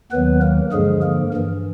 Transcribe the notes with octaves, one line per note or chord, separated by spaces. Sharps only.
D#2 D#3 F#3 B3 B4
A#3 A#4
G2 D3 F3 G#3 G#4
A#3 A#4
G2 E3